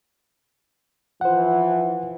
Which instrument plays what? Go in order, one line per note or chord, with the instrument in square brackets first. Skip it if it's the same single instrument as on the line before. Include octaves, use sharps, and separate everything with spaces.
[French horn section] E3 F3 [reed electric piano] C5 F#5